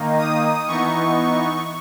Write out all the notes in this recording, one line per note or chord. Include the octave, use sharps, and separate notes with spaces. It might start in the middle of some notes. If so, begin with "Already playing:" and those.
Already playing: D#3 A#3 D#4
D#6
E3 B3 D#4 C#6